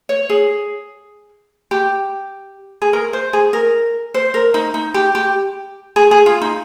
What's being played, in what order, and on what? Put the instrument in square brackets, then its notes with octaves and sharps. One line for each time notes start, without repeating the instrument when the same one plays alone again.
[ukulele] C#5
G#4
G4
G#4
A#4
C5
G#4
A#4
C5
A#4
D#4
D#4
G4
G4
G#4
G#4
F4
D#4